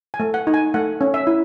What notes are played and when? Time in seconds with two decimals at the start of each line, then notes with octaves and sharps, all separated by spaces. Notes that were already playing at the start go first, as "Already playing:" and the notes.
0.14 G#5
0.20 A3
0.34 F#5
0.47 D#4
0.54 G#5
0.74 A3 F#5
1.01 C#4
1.14 E5
1.27 E4